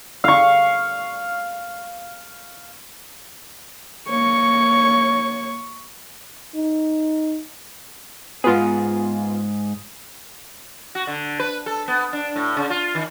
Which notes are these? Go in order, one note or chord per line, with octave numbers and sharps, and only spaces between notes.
F5 C#6
A#3 C#5 C#6
D#4
G#2 B3 F4 G#4
F#4
D3
B4
A4
B3
D4
A2
C#3
F4
D#3